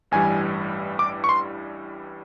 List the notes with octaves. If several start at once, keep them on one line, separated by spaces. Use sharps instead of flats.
A1 G2 E3 G3 G#5
D6
C#6
C6